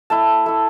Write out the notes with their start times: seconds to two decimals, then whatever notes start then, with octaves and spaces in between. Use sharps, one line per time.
0.10 A3 E4 A5
0.46 A3 E4